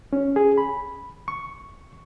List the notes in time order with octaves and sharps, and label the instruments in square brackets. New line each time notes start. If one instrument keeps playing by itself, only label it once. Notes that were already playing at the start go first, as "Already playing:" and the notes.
[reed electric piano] C#4
G#4
B5
C#6